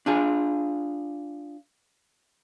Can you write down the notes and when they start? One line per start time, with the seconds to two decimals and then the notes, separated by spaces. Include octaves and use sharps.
0.06 D4 F4 G#4